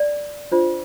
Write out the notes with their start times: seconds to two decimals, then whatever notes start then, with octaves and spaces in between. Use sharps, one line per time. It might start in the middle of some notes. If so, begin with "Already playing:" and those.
Already playing: D5
0.52 D4 F4 C5